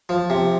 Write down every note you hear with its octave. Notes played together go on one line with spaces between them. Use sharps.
F3
C3